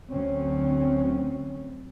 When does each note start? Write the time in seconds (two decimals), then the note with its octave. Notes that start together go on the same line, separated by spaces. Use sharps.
0.12 D2 F#3 C4 C#4